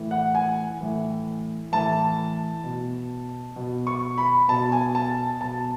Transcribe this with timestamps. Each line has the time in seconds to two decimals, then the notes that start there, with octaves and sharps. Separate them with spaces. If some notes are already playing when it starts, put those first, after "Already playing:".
Already playing: A2 E3
0.11 F#5
0.35 G#5
0.81 A2 E3
1.72 A2 E3 A5
2.64 B2
3.56 B2
3.87 C#6
4.18 B5
4.48 B2 A5
4.72 G#5
4.95 A5
5.41 B2 A5